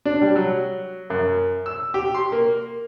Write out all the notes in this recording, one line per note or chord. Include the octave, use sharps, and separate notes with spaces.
D4
G3
F#3
F#2
E6
G4
C6
A#3